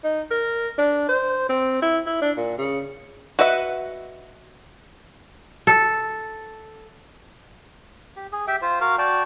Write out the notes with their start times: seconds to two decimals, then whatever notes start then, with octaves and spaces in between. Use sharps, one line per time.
0.04 D#4
0.31 A#4
0.78 D4
1.09 C5
1.49 C4
1.82 E4
2.06 E4
2.22 D4
2.37 A#2
2.58 C#3
3.39 F#4 B4 D#5 E5 F#5
5.67 A4
8.16 G4
8.32 G#4
8.48 G4 E5 G5
8.62 F4 C5
8.81 F#4 A#4 F5
8.98 F#4 D5 G5 A5